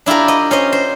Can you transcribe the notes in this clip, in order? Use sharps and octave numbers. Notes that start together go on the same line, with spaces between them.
D4 E4 F4 G4 A#4
D#5
C#4 C5 D#5
C5